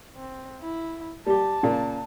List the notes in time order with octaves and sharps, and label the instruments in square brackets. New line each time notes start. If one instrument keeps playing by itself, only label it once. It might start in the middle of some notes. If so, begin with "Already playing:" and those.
[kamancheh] C4
E4
[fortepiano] G3 G4 [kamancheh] A5
[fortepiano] A#2 C#3